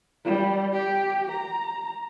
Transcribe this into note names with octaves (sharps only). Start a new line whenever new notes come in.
G3
G4
A#5